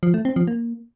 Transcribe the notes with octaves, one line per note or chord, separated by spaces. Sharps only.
F3
A3
C4
F3
A#3